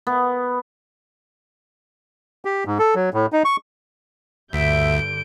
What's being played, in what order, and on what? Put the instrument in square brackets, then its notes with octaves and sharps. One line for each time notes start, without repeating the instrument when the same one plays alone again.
[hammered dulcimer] B3
[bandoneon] G4
G#2
A4
F#3
A2
D#4
C#6
[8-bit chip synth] D2 [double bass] G2 D3 [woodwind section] E5 [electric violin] G6 D7